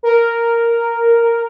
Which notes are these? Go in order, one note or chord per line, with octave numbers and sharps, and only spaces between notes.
A#4